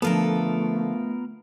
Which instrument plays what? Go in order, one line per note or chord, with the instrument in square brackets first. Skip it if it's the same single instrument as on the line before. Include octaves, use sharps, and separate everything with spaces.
[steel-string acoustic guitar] D3 F3 A4 [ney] A3 [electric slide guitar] B3 F4 A#4